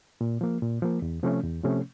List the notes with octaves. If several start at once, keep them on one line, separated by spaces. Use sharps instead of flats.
A#2
F3 A#3
A#2
F3 A#3
E2
C3 F3 A3 C#4
E2
C3 F3 A3 C#4